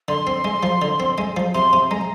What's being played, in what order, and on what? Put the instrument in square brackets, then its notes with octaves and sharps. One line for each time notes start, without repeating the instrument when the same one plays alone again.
[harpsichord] D3 [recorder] C6
[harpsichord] C4
G#3
F3
D3
C4
G#3
F3
[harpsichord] C3 [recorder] C6
[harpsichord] C3
[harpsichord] G#3 [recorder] A#5